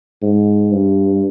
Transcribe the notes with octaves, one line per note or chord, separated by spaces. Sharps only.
G#2
G2